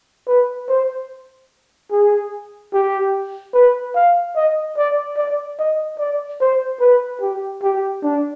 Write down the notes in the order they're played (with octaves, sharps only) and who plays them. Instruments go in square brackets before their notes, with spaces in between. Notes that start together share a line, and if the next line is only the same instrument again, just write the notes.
[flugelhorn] B4
C5
G#4
G4
B4
F5
D#5
D5
D5
D#5
D5
C5
B4
G4
G4
D4